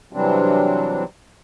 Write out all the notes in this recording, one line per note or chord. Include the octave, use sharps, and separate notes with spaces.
C3 E3 F#3 G3 C4 D4